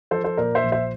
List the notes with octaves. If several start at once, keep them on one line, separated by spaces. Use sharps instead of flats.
F3 A4 C5
A4 C5
A#2 A#4 D5
C5 E5
A#1
C5 E5